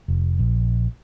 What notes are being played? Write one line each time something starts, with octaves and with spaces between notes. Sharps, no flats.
F1
A#1